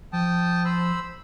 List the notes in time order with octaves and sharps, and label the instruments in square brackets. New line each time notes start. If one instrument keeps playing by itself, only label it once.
[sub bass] F3 [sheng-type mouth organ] G5 A5 D#6
[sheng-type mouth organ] C5 B5 E6